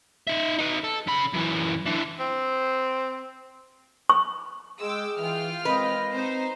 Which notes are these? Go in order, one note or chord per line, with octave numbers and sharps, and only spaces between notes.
D#4 E5
D#4 B4
A4
C#3 B5
F#2 E3
D3 E3
C4
C#6
G#3 G#4 G5 D6 E6
E3 F4 G5 F6
D#3 G#3 C4 B4 D#5
C4 D#4 C5